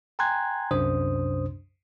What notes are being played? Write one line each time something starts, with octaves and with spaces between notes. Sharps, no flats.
G5 G#5 A#5 C6 F#6 G#6
C2 F#2 C3 D4 C5 D#6